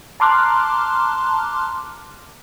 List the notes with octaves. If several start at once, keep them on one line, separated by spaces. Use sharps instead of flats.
A5 A#5 C6 D6 F6 F#6